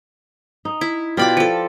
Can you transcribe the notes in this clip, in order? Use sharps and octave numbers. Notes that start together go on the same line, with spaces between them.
D#4
E4
B2 F4 G4 D5 B5 D6
F3 A4